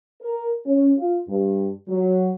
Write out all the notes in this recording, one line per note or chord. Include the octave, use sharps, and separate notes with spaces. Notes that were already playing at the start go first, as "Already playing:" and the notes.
A#4
C#4
F4
G2
F#3